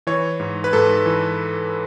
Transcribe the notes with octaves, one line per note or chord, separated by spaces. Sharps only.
E3 C#5
G#2
B4
G#2 A4
E3